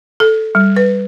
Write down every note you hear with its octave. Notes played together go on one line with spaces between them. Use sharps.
A4
G3
B4